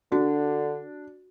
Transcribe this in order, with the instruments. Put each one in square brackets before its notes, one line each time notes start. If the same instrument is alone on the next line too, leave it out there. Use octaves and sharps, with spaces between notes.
[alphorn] D3 [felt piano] D4 [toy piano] F#4